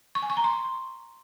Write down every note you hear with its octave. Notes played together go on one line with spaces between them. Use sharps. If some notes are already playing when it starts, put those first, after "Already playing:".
C#6
G#5
C#6
A#5
C6